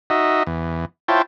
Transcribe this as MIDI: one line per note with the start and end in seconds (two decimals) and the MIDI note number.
0.10 0.43 63
0.10 0.43 66
0.10 0.43 75
0.10 0.43 76
0.47 0.85 40
1.08 1.22 64
1.08 1.22 65
1.08 1.22 72
1.08 1.22 73
1.08 1.22 79
1.08 1.22 81